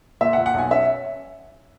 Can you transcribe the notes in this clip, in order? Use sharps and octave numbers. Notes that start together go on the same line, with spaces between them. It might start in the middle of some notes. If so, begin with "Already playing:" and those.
A#2 E5
F#5
A#2
F#5
B1 G#5
C#4 E5